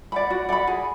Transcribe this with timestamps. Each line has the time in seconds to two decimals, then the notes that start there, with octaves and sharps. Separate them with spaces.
0.12 D5 F#5 B5
0.30 F#4
0.49 D5 F#5 B5
0.67 G#4